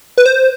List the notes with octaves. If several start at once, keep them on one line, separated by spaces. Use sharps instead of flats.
B4
C5